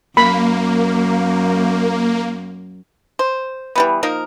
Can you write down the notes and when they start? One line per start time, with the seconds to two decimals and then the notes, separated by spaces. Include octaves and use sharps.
0.17 F#2 A#3 B5
3.19 C5
3.76 E3 G3 B3
4.03 F3 A#3 D#4 A#4